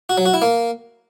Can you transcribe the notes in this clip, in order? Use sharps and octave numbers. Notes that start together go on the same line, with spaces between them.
F#4
F#3
F#4
E4
A#3